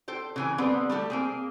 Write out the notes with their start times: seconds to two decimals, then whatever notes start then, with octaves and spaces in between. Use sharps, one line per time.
0.08 A4 C5 G5
0.36 C#3 E3 G#5
0.58 D3 G3 B3 C4
0.89 G3 A3 G4 A4
1.10 A#3 C4 G#4